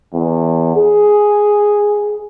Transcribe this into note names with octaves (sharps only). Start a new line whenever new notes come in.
E2
G#4